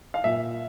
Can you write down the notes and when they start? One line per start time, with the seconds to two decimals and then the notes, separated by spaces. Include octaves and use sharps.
0.14 F5
0.24 A#2 E5